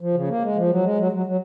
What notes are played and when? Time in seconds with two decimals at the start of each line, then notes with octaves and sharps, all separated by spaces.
0.01 F3
0.14 C#3
0.28 A#3
0.43 G#3
0.56 F3
0.70 F#3
0.84 G#3
0.98 F#3
1.12 F#3
1.26 F#3